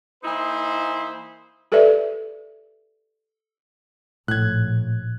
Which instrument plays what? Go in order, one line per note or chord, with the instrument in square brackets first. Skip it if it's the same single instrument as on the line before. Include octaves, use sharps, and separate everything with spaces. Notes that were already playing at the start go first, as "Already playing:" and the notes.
[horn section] E3 A#3 D#4 E4 C5
[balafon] G4 A4 B4 D5 E5
[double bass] A#1 [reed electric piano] A2 [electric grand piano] F#6 G#6